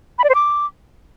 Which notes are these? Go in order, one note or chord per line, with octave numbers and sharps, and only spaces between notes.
B5
D5
C5
D6